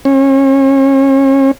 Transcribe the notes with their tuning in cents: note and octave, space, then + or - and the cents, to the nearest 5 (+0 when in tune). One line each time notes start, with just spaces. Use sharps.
C#4 -35